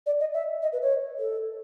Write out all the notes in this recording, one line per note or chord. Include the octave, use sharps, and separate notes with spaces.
D5
D#5
E5
D#5
B4
C#5
A4